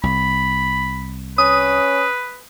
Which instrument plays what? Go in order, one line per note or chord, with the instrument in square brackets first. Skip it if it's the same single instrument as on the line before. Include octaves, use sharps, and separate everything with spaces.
[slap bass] C2 [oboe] B5
[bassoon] C#4 [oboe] B4 [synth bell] D#6